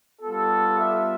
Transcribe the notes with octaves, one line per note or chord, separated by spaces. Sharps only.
G3 B3 F4 A4
E5